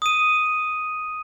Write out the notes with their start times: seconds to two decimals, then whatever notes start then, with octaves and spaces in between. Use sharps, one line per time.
0.02 D#6 D#7